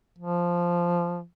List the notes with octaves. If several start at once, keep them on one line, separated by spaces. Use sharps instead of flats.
F3